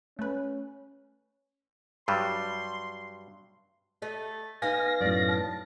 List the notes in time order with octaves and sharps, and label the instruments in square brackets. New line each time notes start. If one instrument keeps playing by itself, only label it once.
[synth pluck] A3 B4 [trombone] C#4
[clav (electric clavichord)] G2 F#3 G3 [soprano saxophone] C6
[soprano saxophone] A3 [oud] D#5
[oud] B3 D#4 [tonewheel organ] F5 A#6 [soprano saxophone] G#5
[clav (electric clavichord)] F#2 A2 [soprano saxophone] D5
[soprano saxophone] A5